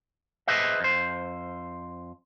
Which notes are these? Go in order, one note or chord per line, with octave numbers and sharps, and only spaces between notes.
G#4 B4 C5 D#5 E5
F2 C5